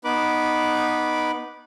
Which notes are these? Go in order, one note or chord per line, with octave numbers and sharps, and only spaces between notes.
B3 D#4 B4 B5 D6